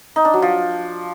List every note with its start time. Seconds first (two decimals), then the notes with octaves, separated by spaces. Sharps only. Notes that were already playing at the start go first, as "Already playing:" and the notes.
0.16 D#4
0.25 D4
0.34 F#3
0.42 F3